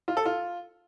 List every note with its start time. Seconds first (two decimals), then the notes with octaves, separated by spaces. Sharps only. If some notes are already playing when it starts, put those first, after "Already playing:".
0.08 F4
0.17 A4
0.26 F4